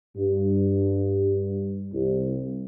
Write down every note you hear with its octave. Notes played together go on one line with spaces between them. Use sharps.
G2
C2